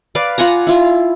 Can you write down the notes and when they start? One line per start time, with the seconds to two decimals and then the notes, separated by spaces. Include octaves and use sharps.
0.15 B4 D5 F5
0.38 F4 F#5 G#5 A#5
0.67 E4 F4